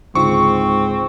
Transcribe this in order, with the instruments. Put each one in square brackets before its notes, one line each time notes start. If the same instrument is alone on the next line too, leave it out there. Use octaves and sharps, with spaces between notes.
[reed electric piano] C#2 D3 F4 [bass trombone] G#2 [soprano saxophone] C4 [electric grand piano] C#6